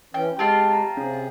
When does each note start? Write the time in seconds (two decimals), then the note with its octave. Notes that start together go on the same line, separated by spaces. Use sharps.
0.14 E3 C#4 G5
0.39 G#3 C4 F4 G4 A5
0.72 A#5
0.97 C3 C#4 G#4